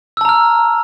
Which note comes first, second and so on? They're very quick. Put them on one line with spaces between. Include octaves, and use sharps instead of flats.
E6 A5 A#5 F6